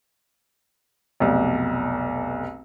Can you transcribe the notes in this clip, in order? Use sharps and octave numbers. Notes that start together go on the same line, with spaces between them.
F1 B1